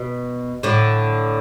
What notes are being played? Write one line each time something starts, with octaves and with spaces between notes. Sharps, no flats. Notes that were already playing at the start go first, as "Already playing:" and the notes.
Already playing: B2
A2 D3